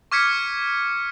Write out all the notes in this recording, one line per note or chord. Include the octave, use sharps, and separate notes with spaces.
C#6 D6 F6 G#6 B6 C#7